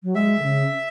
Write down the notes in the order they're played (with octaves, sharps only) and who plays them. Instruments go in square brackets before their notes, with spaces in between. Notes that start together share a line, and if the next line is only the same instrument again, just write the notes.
[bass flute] F#3
[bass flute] G#3 [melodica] E5
[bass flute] D#3
C#3